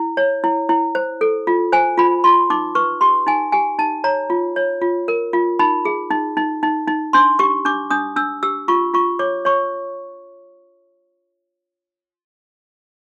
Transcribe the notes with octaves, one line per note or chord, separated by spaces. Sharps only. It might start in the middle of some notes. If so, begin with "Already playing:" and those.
Already playing: E4
C#5
E4
E4
C5
A4
F4
C5 G#5
F4 B5
F4 C6
D#4 D6
B4 C#6
G4 C6
D#4 G#5
G4 G#5
D#4 A5
C#5 A#5
F4
C#5
F4
A#4
F4
D#4 B5
G#4
D#4
D#4
D#4
D#4
D4 C6
G4 C#6
D4 D6
D4 D#6
D4 E6
G4 E6
F4 C#6
F4 C#6
C#5 D6
C#5 C#6